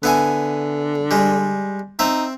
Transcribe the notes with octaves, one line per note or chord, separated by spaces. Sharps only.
D3 B3 E4 G#5
G3 G#3
C4 D#4 E5